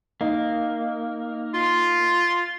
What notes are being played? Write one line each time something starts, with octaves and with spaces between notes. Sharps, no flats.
A#3 D#4
F4 C6